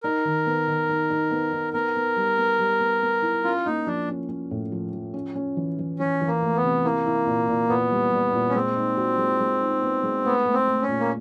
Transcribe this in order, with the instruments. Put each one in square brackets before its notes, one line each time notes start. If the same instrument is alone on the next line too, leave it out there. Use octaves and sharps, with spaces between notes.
[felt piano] D#4 [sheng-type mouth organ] A#4
[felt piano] D#3
B3
D#3
D#4
D#4
B3
D#4
[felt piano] B3 [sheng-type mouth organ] A#4
[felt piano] B3
G3
B3
G3
B3
B3
E4
[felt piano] C#4 [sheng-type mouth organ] F4
[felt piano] A#3 [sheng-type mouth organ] D#4
[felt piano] F3 [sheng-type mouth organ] D4
[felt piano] C#4
C#4
A2
F3
F3
C#4
C#4
E3
E3
[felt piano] E3 [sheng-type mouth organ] C#4
[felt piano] E3
[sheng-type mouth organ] A#3
[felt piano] A3
[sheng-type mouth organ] B3
[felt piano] C3
[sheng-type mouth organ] A#3 [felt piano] E4
[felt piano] E4
A#2
A#2
[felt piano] A#2 [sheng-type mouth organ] B3
[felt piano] G3
G3
A#2
[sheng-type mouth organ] C#4
[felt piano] G#3 [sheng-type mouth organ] C4
[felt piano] D#4
F#4
G#3
G#3
D#4
B3
G#3
[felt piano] A3 [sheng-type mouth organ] B3
[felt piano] A3
[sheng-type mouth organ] C4
[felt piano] A3
[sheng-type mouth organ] C#4
[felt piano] A#2
[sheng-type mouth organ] A#3